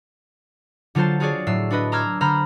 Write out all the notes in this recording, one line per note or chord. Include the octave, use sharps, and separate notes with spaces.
D3 F#3 F4 A4 C5 A5
F4 F#4 G#4 C#5 D5
A2 F#3 E6 C7
D4 F#4 B4 D#5
A#5 C6 D6 E6 F6 G#6
D3 C5 A#5 B5 F6